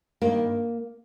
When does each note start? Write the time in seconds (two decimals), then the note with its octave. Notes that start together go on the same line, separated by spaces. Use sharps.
0.22 G2 D#3 A#3